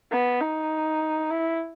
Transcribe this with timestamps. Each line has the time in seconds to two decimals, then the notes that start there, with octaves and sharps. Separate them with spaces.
0.12 B3
0.41 D#4
1.30 E4